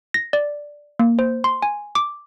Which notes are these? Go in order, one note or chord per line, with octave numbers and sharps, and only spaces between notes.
A#6
D5
A#3
C5
C6
G#5
D6